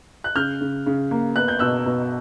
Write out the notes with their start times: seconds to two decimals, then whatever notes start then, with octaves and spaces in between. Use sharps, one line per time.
0.24 F#6
0.36 C#3 F6 G6
0.61 C#3
0.86 C#3
1.11 A#3
1.36 B3 F#6
1.48 G6
1.59 B2 E6 F#6
1.86 B2